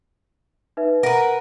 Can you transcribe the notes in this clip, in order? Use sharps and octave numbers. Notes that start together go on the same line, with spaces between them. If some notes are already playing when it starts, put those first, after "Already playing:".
D#4 B4 E5
A#4 B4 F#5